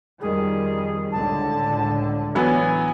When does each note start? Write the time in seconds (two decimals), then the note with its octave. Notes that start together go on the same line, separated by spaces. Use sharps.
0.21 F2 D#3 G3 G#4
1.12 C#2 A2 D3 A5
2.35 E3 F#3 B3 G#5